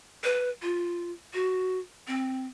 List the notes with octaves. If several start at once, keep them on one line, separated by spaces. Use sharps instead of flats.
B4
F4
F#4
C4